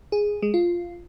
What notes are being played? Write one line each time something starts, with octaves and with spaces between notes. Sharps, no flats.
G#4
G#3
F4